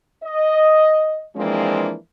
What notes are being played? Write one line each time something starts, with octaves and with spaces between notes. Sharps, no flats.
D#5
E3 F3 G#3 A#3 C4 D4